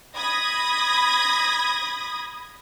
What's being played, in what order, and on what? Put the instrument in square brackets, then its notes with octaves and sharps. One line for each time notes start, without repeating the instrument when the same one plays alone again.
[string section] B5 D#6 G#6 A#6